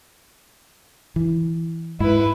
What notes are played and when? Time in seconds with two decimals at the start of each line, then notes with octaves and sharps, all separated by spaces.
1.16 E3
2.00 G#2 E4 B4